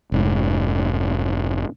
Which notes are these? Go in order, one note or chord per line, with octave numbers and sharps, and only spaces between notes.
F1 G#2